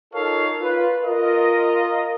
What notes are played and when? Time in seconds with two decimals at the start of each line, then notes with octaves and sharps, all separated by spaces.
0.14 D#4 F4 A4 A#4 C#5 F5
0.60 F4 B4
1.04 F4 A#4 D#5